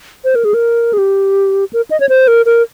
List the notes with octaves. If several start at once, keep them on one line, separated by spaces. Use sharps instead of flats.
C5
A#4
G#4
A#4
G#4
G4
A#4
D#5
C#5
C5
A#4
A#4